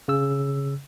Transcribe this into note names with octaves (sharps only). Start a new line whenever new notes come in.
C#3 E6